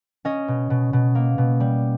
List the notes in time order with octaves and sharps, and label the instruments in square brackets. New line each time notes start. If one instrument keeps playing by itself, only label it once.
[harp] C#4 D#5
B2
B2
B2
A#3
B2
G3